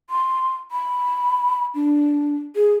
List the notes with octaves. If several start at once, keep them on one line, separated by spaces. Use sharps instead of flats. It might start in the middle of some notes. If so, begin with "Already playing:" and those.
C6
B5
D4
G#4